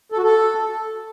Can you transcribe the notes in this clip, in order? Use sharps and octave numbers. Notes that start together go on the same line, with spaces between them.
A4
F#4
A4